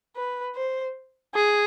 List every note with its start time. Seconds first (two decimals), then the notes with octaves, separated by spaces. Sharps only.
0.15 B4
0.55 C5
1.34 G#4